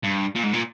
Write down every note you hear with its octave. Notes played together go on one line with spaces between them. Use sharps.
G2
A#2
G#2
A#2